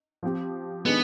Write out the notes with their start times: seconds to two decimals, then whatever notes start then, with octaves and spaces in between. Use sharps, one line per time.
0.23 F3 C4 G4
0.86 D#3 G#3 B3 D4